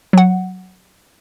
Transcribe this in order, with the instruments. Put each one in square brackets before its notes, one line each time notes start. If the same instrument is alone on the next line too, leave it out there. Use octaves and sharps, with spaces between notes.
[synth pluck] F#3 F#5